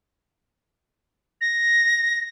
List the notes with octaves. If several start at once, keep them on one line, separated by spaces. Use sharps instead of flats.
A#6